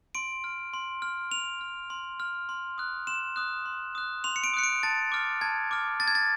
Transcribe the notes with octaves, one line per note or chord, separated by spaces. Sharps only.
C6 D7
F6
C6
F6
C6 F7
F6
C6
F6
C6
D#6 F#6
C6 E7
D#6 F#6
C6
D#6 F#6
C6 F7
C#7
D7
D#6 F#6 C#7
D7
A5 A6
D6 F6
A5 G#6
D6 F6
A5 A6
G#6
A6